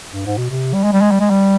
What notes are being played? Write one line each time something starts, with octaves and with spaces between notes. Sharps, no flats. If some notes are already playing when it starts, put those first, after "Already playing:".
G2
G#2
B2
C3
G3
G#3
G3
G#3
G3
G#3
G3